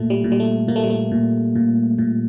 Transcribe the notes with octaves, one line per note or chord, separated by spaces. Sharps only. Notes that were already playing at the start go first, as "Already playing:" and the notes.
Already playing: A#2 A3
G3
A#2
G3
A3
A#2 A#3
A3
G3
A3
A#2
A#2
A#2